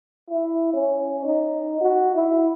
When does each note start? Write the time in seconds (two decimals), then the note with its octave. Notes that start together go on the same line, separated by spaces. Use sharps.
0.30 E4
0.73 C#4
1.25 D#4
1.81 F#4
2.15 E4